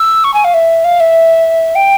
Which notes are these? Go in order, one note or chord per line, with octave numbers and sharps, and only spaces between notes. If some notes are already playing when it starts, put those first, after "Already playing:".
Already playing: E6
C#6
G#5
F5
E5
F5
E5
G5